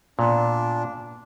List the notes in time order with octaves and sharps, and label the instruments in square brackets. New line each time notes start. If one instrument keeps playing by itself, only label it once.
[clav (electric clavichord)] A#2 B3 [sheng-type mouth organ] D4